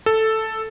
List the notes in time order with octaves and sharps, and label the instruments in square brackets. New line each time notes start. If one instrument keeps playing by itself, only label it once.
[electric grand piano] A4